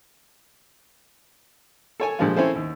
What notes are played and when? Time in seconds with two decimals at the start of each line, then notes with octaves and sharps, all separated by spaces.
2.00 A4 C#5 G#5
2.19 A#2 D3 F3 G3 G#3 F4
2.36 C4 C#4 E4 A4 C5
2.55 D#2